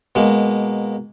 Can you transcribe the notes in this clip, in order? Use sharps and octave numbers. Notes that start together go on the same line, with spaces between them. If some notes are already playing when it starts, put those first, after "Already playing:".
B2 G#3 A#3